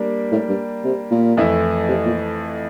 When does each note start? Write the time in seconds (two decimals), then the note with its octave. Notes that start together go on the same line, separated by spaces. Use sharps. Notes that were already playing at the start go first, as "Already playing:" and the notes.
Already playing: G3 A#3 D4
0.32 A2
0.49 G2
0.85 C3
1.11 A#2
1.37 F2 E3 A3 E4
1.89 C3
2.06 A#2